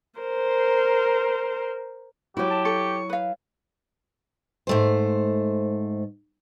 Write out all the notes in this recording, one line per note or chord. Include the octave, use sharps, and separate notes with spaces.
A#4 C5
F#3 E4 F#4 G4
A5
A4 C#6
B4 F5
G#2 A3 C5